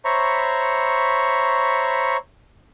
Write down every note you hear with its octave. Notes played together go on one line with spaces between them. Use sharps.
C5 C#5 E5 A#5 B5 C#6